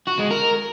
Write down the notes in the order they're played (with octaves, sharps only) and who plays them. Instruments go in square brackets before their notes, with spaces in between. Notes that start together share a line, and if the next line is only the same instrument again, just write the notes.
[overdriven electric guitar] F#4
G#3
A#4